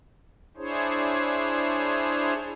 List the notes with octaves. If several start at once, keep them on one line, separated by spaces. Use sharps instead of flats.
D4 E4 G#4 C5 C#5